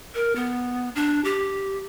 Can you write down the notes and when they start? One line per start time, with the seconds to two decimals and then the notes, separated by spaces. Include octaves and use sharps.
0.15 A#4
0.36 B3
0.95 D4
1.24 G4